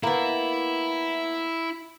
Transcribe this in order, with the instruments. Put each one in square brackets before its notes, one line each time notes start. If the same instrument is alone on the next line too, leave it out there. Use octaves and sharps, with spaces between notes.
[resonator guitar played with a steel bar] A#3 B3 [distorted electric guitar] E4